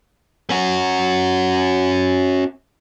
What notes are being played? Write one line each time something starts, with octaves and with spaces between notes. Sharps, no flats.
C#4 F#4